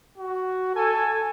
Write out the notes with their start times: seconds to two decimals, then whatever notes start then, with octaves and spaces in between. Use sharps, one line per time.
0.18 F#4
0.76 A4 G#5